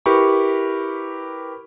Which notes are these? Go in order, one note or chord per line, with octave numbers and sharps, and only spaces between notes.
E4 G4 A#4 B4 B5 C#6